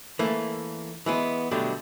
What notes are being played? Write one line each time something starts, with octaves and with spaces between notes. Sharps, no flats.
E3 A3 A#3 C#4
E3 G#3 B3
B2 D3 F#3 G3 A3 G4